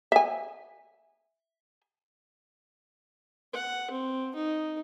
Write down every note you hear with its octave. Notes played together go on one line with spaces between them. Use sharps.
E5 G#5
F#5
C4
D#4